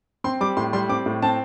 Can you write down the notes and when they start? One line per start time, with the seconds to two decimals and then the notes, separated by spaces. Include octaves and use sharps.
0.24 C4 C6
0.41 G3 D6
0.57 A2 C6
0.73 G3 C6
0.89 C4 D6
1.06 A2
1.22 C4 A5